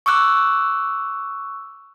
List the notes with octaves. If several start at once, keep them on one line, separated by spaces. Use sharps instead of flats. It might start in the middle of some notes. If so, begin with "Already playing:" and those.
C#6 D6 E6 F#6